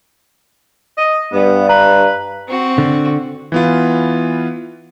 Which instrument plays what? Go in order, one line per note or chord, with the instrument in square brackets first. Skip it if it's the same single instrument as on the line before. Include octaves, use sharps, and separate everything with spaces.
[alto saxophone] D#5
[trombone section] G2 [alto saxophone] B3
[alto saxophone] B4 [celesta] A#5
[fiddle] C4 F#4
[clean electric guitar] D3
[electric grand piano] E3 B3 F4